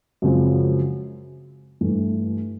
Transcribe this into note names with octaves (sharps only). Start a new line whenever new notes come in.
F#2 C#3 F3 G#3 C4
G2 E3 A3